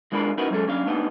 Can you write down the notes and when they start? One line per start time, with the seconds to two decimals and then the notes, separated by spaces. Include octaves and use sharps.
0.12 E3 G#3 D4 F4 A#4 B5
0.38 C#4 D#4 E4 F#4 A#4 B4
0.50 F#3 G#3 C#4 A4
0.67 F#3 C#4 D4 F5
0.86 A3 B3 D4 D#4